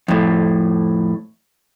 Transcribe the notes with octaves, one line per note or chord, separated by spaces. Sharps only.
F2 A2